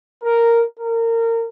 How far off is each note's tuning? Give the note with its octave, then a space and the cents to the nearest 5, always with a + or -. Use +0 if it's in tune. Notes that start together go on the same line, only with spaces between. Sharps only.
A#4 -5
A#4 -25